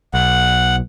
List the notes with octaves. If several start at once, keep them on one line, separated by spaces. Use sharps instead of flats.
B1 F#5